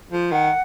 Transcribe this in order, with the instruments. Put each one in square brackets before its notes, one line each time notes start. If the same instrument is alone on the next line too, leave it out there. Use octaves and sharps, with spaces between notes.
[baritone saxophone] F3
[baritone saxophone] D#3 [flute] F#5